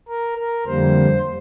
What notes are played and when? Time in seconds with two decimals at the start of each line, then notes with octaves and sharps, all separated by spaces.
0.08 A#4
0.38 A#4
0.67 F2 D3 G3 A#3 C5